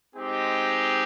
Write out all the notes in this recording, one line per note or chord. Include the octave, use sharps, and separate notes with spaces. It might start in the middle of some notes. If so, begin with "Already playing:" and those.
G#3 C4 D#4 G4